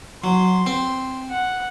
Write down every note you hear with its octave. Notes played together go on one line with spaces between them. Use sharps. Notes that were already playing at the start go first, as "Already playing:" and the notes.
F#3 C6
C4
F#5